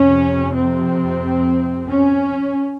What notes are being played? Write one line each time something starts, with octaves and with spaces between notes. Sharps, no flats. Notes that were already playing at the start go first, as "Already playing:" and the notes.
Already playing: F2 C3 C#4
C4
C#4